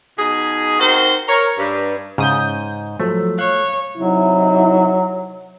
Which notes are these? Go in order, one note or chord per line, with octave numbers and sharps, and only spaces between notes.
B2 D#4 G#4
C4 D#4 F#4 A#4 C5
A#4 C#5
G2
G#2 C#3 D#6 G6
F3 F#3 A3 A4
C#5 F5 F#6
C3 F#3 D#4 E4